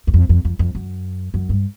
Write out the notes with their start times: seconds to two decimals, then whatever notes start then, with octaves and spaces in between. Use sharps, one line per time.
0.07 E2
0.14 F2
0.29 F2
0.45 F2
0.59 F2
0.75 F#2
1.34 F#2
1.49 G2